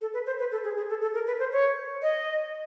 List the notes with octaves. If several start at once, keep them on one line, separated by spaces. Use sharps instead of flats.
A4
B4
C5
B4
A4
G#4
G#4
A4
A4
A#4
B4
C5
C#5
D#5